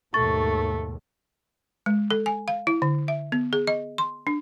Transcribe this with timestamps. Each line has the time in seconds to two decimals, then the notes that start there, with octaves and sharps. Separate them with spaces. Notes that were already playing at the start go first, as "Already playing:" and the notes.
0.14 D#2 G#2 B2 A3 C#6 A6
1.86 G#3
2.11 A4
2.26 G#5
2.48 F5
2.67 E4
2.82 D3
3.08 E5
3.32 B3
3.53 G#4
3.67 D#5
3.98 C6
4.27 D4